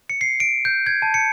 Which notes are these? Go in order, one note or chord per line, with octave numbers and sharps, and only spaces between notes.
C#7
C7
D7
G6
G#6
A5
C#7